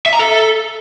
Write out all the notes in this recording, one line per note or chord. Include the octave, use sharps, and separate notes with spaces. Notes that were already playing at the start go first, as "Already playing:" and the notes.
E5
A#5
A4